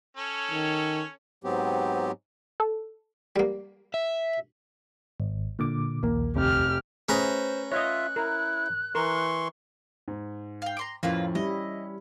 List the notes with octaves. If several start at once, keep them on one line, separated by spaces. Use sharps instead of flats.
C#4 A4 C#5
D#3
G#2 F#3 B3 C4 G4
A4
G3 A#3
E5
G#1
A#2 D3 D6
A#1 D#2 A#3
F1 G4 F6
A3 C#4 G#4 B4 C5 A#5
F4 C#5 D#5 E5 F#6
E4 A#4
E3 A#4 C6 C#6
G#2
F5 G5
A#5 C6 D6
F2 A2 A#3 C#4 F4 B4
G3 C#4 E4 D#5